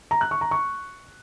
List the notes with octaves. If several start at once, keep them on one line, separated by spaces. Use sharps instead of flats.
A#5
F#6
C#6
A#5
C#6